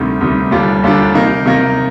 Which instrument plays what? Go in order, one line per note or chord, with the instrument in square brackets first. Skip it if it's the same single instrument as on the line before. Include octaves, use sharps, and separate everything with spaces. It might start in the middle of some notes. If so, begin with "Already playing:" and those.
Already playing: [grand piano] D2 C3 D#3 G3
D2 C3 D#3 G3
D#2 D3 G3 D4 F4
D#2 D3 G3 D4 F4
C3 D#3 A#3 D#4
C3 D#3 A#3 D#4